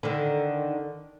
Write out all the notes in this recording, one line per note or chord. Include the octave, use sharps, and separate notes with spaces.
D3 D#3